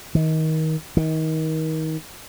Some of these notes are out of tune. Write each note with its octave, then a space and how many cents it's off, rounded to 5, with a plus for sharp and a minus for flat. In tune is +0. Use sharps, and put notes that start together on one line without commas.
D#3 +25
D#3 +30